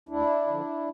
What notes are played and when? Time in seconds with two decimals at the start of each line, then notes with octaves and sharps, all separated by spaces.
0.09 D2 D4 E4
0.47 D3 F3